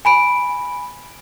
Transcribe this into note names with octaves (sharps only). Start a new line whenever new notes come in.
G#5 B5 D7